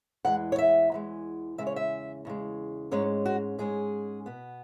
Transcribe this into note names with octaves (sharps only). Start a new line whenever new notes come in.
E2 E3 G#3 F#5
C#5
E5
E2 E3 G#3
E2 C#3 G#3 E5
C#5
E5
E2 C#3 G#3
G#2 G#3 C#4 C#5
F#4
G#2 G#3 C#4 G#4
B2 B3